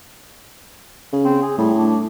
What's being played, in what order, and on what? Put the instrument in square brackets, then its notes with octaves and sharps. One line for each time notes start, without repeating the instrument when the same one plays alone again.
[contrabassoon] C#3
[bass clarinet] C4
G#4
[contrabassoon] A2 [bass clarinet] G3
[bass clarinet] D4